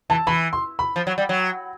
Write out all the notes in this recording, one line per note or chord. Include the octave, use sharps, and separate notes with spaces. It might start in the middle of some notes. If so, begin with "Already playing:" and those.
E3 A5
E3 B5
C6
B5
F3
F#3
G3
F#3